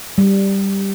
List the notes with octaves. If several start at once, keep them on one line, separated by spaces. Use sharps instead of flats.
G3